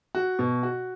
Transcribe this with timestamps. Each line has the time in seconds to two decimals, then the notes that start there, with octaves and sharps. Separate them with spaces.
0.15 F#4
0.39 B2
0.63 F#4